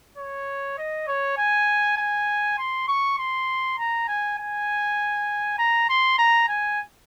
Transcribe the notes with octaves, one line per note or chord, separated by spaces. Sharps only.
C#5
D#5
C#5
G#5
G#5
C6
C#6
C6
A#5
G#5
G#5
A#5
C6
A#5
G#5